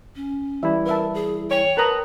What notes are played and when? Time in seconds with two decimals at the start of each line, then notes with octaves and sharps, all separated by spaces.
0.16 C#4
0.63 E3 G3 E4 E5
0.86 A#4 B4 E5 A5
1.15 G#4
1.51 C#5 G5
1.77 A#4 B4 A5 A#5 D#6